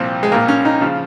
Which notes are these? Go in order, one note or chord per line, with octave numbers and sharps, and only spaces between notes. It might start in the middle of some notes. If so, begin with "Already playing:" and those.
Already playing: C2 A#2 F3 C4
G#3
C2 A#2 F3 A#3
C#4
D#4
C#3 F3